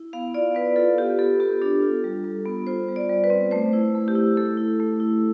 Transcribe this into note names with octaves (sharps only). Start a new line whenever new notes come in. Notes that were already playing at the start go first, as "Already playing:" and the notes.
Already playing: E4
B3 F5
F4 D5
B3 B4
F4 A4
F4 G4
B3 A4
B3 G4
D4 A4
F4
G3
G3
B3
F4 C5
G3
D5
G3
B4
C4
A3 C5
E4
A3
G4
E4
A3 A4
E4
A3
E4